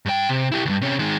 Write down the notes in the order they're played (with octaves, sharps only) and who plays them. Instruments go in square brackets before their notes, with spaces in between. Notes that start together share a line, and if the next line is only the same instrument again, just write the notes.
[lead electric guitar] G2 G5
C3
E4 G4
D2 G2
C3 C#4
D#3 G#3